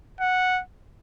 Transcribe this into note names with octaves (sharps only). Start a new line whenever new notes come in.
F#5